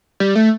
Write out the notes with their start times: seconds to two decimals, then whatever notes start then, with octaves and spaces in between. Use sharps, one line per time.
0.20 G3
0.35 A3